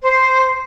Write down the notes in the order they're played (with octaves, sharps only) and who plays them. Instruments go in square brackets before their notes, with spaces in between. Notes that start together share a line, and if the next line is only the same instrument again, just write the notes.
[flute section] C5